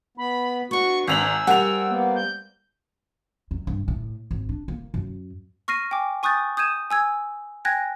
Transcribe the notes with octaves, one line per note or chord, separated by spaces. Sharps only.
B3 B5
B3 D4 F#4 C#6
G#1 G#5 E6 F7 F#7
G3 A#4 C5 F#5 F7
A#3 B3
G6
F#2
G2
A2
G#1
D4
A#3
F#2
C#6 F6 A#6 C7 D#7
G5 G#5 D6
G#5 C#6 D#6 F#6 G6 A6
D#6 G6 G#6 D#7 E7
G#5 E6 G#6
G5 G#5 F#6 G#6 A#6